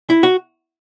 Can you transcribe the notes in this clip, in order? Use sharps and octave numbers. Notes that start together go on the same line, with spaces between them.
E4
F#4